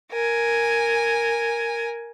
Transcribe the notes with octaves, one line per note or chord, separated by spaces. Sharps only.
A#4 G#5